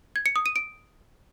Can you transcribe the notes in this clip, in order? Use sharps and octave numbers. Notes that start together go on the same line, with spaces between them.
G#6
C#7
D#6
D#7
D7